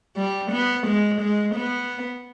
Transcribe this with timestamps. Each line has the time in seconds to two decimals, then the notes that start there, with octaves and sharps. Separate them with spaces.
0.17 G3
0.52 B3
0.87 G#3
1.21 G#3
1.55 B3